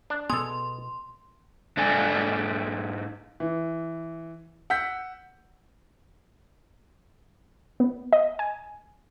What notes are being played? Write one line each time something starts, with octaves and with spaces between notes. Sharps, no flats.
D4
B2 B3 G#4 A4 C6
G#2 D4 A4 D5 G#5
E3
F#5 E6 G6 B6
B3
D#5
G#5